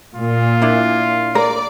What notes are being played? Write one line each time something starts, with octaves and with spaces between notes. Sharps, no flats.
A#2 F4
D4 E4
A#4 D5